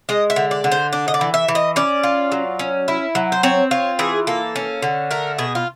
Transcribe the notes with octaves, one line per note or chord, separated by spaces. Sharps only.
G#3 D#5
E5
D3
D5
D3
C5
D4
D#5
D5
E3
E5
E3
D#5
C#4 D5
F4
F#3
C#4
E4
F#3
C5
C4 C#5
F4 C#5
E3 G#4
A#3 A4
C#4
D3
A3 A#4
B2 G#4
F4